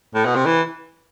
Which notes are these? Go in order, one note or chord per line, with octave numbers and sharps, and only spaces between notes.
A2
B2
C3
E3